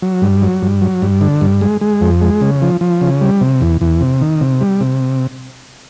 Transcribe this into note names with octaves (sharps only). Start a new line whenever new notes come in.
F#3
G2
F#3
G2
F#3
G2
D3
G2
G#3
G#3
F2
G#3
C#3
F3
F3
C#3
G3
C3
E2
E2
C3
D#3
C3
G3
C3